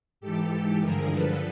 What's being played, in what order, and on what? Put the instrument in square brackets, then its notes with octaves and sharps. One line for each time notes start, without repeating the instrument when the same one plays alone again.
[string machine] G#2 E3 G4 A4
G2 D3 F3 G#4 A#4
A4 B4